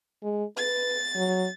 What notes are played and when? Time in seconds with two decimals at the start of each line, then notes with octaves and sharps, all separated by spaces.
0.23 G#3
0.57 B4 A6
1.16 F#3